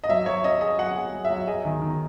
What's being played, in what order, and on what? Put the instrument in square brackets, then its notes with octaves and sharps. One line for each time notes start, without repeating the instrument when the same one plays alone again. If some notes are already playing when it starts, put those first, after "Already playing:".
[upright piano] D#5
[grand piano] F#3 [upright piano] E5
[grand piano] F#3 [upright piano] C#5
[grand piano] C#4 [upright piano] D#5
[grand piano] G#4 [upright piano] D#5
[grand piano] F#3 [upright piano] F#5
[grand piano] G#4
F#3
[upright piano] E5
[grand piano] F#3
[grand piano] G#4 [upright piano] D#5
[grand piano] D#3
D#3